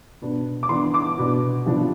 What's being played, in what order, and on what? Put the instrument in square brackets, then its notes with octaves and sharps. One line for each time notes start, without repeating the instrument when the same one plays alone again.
[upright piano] B2 B3 D4
D6
E3 B3 D4 C6
D6
B2 B3 D4
C3 F3 B3 D4